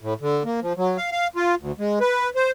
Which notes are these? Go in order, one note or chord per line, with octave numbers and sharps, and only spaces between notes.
A2
D3
A#3
F3
F#3
F5
F5
F4
D2
G#3
B4
C5